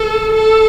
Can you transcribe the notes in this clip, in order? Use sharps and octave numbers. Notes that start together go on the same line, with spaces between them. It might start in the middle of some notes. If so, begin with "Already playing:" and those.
Already playing: A4
A4